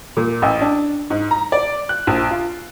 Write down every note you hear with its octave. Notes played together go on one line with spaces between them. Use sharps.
A#2
A1
D4
G#2
A#5
D5
F#6
A#1
F4